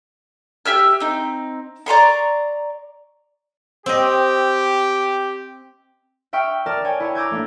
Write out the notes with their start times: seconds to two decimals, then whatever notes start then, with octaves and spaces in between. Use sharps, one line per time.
0.66 G4 E5 E6 F6
1.00 C4 D#4
1.86 D5 A#5 C6 C#6
3.86 C4 G4 D#5
6.33 E5 G5 C#6 F6
6.66 A#4 D5 A5 F6
6.84 C#5 G5 G#5
7.00 E4 C#5 G#5
7.15 A#5 D6 E6 G6 G#6
7.31 A3 A#3 D4